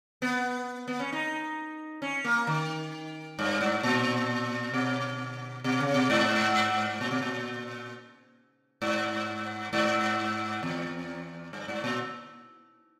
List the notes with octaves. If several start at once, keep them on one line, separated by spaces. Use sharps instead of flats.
B3
B3
C#4
D#4
C#4
A#3
D#3
G2
G#2
A#2
B2
B2
C#3
B2
G#2
A#2
B2
A#2
G#2
G#2
E2
G2
G#2
A#2